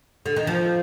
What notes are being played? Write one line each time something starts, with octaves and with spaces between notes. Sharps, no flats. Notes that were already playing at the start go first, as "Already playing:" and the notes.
D3
D#3
F3